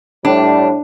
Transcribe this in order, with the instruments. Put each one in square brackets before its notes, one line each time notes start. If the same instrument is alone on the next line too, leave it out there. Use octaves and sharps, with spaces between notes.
[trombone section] A2 G3 [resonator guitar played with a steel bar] D4